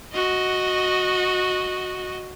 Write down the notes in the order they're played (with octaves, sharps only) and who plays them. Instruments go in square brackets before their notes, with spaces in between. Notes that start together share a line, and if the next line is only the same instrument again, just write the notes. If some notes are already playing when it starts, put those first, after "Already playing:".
[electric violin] F#4 D#5